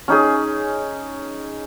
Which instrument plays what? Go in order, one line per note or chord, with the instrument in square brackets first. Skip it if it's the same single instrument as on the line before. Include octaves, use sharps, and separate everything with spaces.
[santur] C#4 D#4 G#4